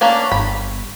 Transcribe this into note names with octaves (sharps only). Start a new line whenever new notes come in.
A#3 C#4 D4
G1 B5